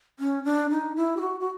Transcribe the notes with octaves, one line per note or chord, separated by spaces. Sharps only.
C#4
D4
D#4
E4
G4
F#4
F#4